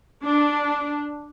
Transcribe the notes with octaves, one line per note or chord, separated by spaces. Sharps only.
D4